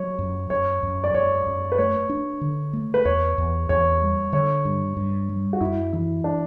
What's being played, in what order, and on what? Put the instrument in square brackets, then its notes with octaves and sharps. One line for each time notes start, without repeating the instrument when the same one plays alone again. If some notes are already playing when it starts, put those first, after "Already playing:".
Already playing: [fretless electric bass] F#3 [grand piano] C#5
[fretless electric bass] F#2
[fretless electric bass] F#2 [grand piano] C#5
[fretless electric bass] F#2
[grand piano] D5
[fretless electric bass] F#2 [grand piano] C#5
[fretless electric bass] F#2
[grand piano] B4
[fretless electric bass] A3 [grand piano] C#5
[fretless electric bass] D4
D3
A3
[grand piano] B4
[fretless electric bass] E2 [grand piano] C#5
[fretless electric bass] E2
[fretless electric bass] E2 [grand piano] C#5
[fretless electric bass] G3
[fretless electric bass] D3 [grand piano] C#5
[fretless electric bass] G2
G2
G3
[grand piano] F#4
[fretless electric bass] F#2 [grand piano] E4
[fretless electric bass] E3 [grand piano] E4
[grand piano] D4